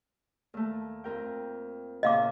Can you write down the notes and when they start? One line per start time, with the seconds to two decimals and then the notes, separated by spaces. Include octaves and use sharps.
0.54 D#2 A3
1.04 F2 A#4 G5
2.03 E2 A#2 C#3 D#5 F5 D6